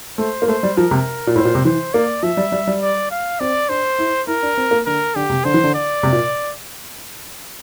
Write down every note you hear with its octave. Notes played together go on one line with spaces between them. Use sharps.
A3 C5
A#3
A3 C5
G3
F3 A#4
C3
A#2
A2 C5
A#2
C3
E3 C5
A#3 D5
F3 E5
G3
G3
G3
D5
F5
C4 D5
D4 C5
E4
E4 A#4
D4
C4
A#3
D3 A#4
D3 G4
C3
D3 C5
E3
D3
D5
C3
A#2